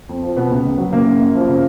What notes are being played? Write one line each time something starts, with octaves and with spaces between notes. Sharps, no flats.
F2
F3
B2 B3
C#2
C#2
F#3
C#3 A#3
F#2
F#2
F3
C#3